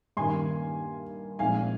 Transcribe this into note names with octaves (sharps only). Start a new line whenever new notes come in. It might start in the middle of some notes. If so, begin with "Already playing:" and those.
G2 D#3 A#3 C#4 G#5 C6
A#1 A#2 F3 G#3 C4 F5 G#5